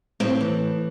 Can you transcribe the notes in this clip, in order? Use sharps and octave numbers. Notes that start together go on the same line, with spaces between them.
A2 C4 E4
E3